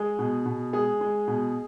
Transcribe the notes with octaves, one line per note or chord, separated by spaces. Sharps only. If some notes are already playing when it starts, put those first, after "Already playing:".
Already playing: G#3 G#4
B2
B2
G#3 G#4
G#3
B2